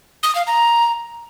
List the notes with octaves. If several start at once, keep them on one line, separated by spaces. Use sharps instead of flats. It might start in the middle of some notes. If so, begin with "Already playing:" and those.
D#6
F5
A#5